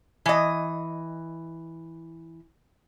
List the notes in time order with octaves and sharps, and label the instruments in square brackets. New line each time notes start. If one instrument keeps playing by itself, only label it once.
[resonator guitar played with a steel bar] E3 D#5